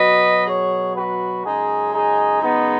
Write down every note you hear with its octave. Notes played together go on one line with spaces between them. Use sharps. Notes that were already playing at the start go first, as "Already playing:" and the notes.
Already playing: B2 F#3 B4 D#5
G#4 C#5
F#4 B4
F#2 C#3 G#3 D#4 G#4
D#4 G#4
B3 D#4